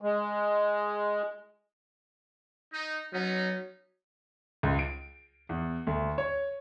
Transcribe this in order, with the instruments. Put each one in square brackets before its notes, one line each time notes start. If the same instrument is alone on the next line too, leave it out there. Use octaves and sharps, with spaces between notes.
[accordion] G#3
[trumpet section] D#4
[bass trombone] F#3 [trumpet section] B3 C#4 D#4
[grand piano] C#2
D7
E2
D2
C#5